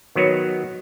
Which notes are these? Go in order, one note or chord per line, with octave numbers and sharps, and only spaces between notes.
D#3 F#3 B3 F#4 C#5